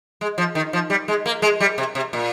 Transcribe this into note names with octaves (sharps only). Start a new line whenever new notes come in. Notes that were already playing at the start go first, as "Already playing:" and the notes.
G#3
F3
D#3
F3
G3
G#3
A#3
G#3
G3
C3
C3
A#2